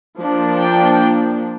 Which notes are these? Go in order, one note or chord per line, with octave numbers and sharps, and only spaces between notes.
F3 A#3 D4
G5